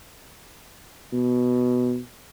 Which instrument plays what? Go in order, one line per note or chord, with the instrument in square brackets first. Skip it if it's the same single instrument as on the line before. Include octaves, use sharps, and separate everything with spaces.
[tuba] B2